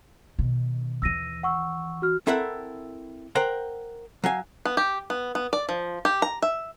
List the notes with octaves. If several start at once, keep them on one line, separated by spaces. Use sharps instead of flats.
B2 D#3
D#2 E3 E6 A#6 D#7
F#5 C#6 E6
F#4 F6
C4 E4 A4 A#4 E5 F#5
A#4 C5 F#5 G5 A#5
F#3 F5 G#5
B3
G4
B3
B3
D5
F3
G4
A#5
E5